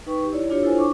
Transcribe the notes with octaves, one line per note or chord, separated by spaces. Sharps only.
D#4 B4 G5 C#6
D#4 G4
E4 C#5 D5
D4 F4 G4 C#5
E4 F4 A4 C5 C#5 G#5
D4 C#6 D6